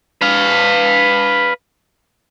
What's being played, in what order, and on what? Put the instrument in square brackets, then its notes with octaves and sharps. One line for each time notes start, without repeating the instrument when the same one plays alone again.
[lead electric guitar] B4 F5